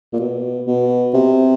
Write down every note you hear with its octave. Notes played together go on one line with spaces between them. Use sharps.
A#2
B2
B2
C3